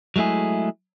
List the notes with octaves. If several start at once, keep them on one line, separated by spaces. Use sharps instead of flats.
F#3 G#3 A3 E4 G#4